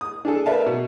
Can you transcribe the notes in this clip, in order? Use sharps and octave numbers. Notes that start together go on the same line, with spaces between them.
D#6
D4 G#4 A4
A#4 B4 D5 E5 F5 A5
B2